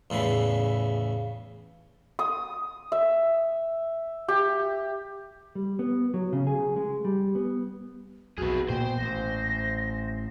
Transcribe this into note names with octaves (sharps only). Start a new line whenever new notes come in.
E2 A2 C#3 E3
D#6
E5
G4
G3
B3
F#3
C#3
G#4
G#3
G3
B3
B1 F2 F#4 G#4 B4
A#2 A#3 B3 C5 G5
A1 A#6